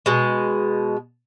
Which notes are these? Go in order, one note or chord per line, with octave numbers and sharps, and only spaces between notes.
B2 G#3